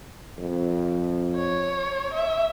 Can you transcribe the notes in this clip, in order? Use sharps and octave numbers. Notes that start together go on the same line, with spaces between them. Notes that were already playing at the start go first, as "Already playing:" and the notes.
F2
C#5
E5